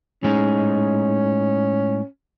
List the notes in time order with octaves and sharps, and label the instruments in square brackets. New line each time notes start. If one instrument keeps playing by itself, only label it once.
[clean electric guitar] A2 G#3 D#4 [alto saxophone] C#4